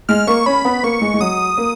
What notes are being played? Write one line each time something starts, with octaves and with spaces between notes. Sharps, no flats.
G#3 F6
A#3 C#6
C#4 B5
B3
A#3 C#6
G#3
G#3
F#3 D#6
A#3